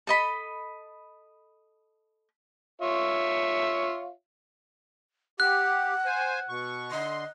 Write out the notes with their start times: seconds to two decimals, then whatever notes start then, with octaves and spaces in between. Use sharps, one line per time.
0.07 A4 D#5 B5
2.82 F4 C#5 E5
5.40 G4 F#5 F#6
6.06 C5 G#5
6.49 B2 C#6
6.91 D3 D#5 C6